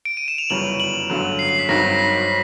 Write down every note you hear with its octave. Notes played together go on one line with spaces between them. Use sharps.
D7
D#7
E7
F7
G1 F#2 C#3 E3 G3 F#7
F#7
A1 G2 D3 F#3
C7
C7
B6
G#1 G2 D#3 F#3 A#6
A#6
B6
B6